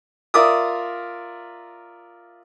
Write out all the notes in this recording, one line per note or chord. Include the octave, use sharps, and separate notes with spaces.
F4 A#4 D5 E5 D6 D#6